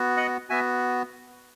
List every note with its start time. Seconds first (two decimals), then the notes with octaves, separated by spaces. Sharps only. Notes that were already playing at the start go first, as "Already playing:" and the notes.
Already playing: B3 F#4
0.17 D#5 F#5
0.49 B3 F#4 E5 G#5